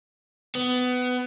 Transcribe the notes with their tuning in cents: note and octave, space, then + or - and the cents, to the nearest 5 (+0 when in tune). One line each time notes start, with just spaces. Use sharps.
B3 +20